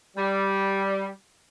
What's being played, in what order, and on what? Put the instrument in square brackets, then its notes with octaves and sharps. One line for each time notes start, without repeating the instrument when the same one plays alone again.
[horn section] G3